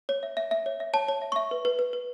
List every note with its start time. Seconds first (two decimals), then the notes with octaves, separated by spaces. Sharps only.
0.09 C#5
0.23 E5
0.37 E5
0.51 E5
0.66 C#5
0.80 E5
0.93 C#5 A5
1.08 C#5
1.22 E5
1.32 E5 C#6
1.51 B4
1.65 B4
1.79 B4
1.93 B4